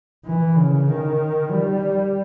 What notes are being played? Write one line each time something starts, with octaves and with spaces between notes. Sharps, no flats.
E3
C#3
D#3
G3